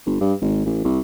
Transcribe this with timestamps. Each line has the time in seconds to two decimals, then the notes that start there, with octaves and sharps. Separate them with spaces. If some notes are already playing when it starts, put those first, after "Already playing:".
0.06 G1
0.21 G2
0.41 G#1
0.65 A1
0.84 C2